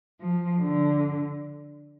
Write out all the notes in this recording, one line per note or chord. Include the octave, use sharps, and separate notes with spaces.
F3
D3